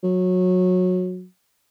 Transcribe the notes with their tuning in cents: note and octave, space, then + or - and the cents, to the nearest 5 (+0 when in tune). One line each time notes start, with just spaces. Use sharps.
F#3 -20